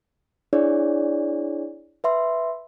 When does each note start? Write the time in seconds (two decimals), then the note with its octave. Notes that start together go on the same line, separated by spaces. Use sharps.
0.53 D4 E4 G#4 C#5 D5
2.04 B4 E5 C6